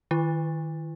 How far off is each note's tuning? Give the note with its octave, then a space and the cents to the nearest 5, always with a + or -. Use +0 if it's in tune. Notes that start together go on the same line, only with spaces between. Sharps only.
D#3 +0 E4 +45